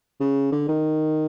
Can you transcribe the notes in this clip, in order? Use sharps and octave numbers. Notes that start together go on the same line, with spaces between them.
C#3
D3
D#3